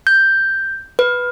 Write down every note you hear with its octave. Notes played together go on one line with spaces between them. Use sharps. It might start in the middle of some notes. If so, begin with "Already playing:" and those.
G6
B4